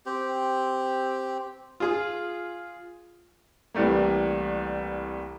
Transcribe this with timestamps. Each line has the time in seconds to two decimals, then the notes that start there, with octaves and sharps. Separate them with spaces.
0.06 C4 G4
1.80 F4 G#4
3.74 C2 E3 G3 A3 A#3